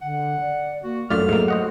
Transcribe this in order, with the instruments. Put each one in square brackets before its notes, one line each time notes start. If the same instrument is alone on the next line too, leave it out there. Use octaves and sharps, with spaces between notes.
[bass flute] D3 [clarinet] F#5
[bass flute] D5
[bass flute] A#3 [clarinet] F#4
[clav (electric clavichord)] F#2 F4 D5 [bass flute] F#3 [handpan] A3 [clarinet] F6
[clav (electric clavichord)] G#2 A#3
[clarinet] F#4 [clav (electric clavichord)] C5 D#5 F#5